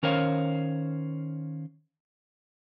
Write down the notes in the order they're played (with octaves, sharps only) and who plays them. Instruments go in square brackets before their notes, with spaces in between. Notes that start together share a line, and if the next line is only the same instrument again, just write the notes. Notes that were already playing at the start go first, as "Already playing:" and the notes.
[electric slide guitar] D#3 C#4 A#4 C5 C#5 F5